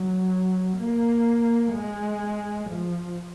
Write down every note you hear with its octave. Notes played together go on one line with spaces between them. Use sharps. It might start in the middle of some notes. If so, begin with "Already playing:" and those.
Already playing: F#3
A#3
G#3
F3